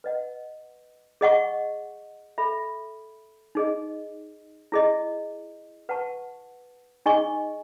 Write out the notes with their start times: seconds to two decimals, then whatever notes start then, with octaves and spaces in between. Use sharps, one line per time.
0.04 B4 D#5 F#5
1.21 G#4 D#5 F#5 C#6
2.38 A4 E5 B5
3.55 D#4 G#4 D#5
4.72 E4 G#4 D#5
5.89 B4 F#5 A5 C#6
7.06 D#4 G#4 D#5 G#5 C#6